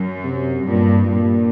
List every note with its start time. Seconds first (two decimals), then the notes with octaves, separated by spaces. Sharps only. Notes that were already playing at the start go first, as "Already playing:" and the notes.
Already playing: F#2
0.24 C3
0.68 G2 A#2
1.11 G2 A#2